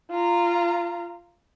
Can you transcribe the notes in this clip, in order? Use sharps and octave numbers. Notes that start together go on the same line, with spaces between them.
F4 A#5